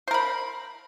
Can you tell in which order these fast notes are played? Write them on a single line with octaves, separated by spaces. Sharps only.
C5 A#4 B5